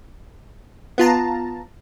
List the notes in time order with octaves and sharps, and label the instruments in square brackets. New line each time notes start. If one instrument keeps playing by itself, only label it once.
[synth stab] B3 F4 A5 A#5